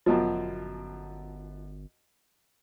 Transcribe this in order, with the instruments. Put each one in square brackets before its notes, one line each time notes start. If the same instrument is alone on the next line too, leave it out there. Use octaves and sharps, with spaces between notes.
[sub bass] G1 [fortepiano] F#2 B2 F3